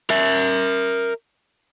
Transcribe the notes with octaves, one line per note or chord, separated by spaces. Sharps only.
A#4 E5